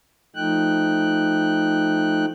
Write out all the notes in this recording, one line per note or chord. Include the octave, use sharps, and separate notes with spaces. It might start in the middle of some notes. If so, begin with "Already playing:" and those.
F3 A3 D#4 G5 F#6